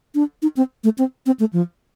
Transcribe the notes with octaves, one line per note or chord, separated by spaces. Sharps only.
D4
D#4
C4
A3
C4
C4
A3
F3